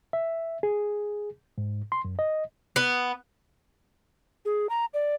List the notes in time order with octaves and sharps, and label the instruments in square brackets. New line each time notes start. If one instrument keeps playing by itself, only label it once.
[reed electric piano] E5
G#4
G#2
C6
F#2
D#5
[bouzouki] B3
[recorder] G#4
A#5
D5